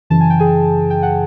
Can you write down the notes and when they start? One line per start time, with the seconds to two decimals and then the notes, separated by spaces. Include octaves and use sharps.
0.10 F#2 C#3 E3 A5
0.20 G#5
0.30 G5
0.40 G#4 G#5
0.90 G5
1.03 F#5